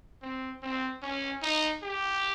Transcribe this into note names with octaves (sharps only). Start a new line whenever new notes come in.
C4
C4
C#4
D#4
G4